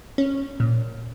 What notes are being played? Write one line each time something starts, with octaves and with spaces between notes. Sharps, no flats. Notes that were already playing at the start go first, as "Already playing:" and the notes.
C#4
A#2